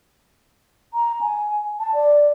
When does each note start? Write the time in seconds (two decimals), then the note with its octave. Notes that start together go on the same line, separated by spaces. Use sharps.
0.94 A#5
1.21 G#5
1.79 A5
1.93 D5